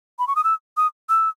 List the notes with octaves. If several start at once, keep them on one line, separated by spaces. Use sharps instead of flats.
B5
C#6
D#6
E6
D#6
E6